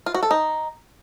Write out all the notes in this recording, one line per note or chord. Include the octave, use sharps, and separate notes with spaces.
F4
F#4
A4
D#4